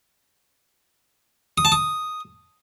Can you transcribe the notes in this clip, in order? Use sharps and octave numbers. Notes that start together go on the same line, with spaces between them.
D#6
A5
D#6